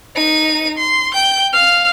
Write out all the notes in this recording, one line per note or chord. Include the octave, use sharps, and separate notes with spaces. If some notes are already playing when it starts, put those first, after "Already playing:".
D#4 D#7
C6
G5 G6
F5 F6